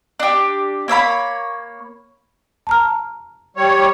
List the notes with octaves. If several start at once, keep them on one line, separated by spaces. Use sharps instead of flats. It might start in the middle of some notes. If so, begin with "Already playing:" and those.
D4 G4
A#3 C#5 E5 B5
A5 A#5 F6
G3 C#5